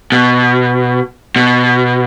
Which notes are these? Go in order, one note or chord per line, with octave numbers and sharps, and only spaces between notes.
B2
B2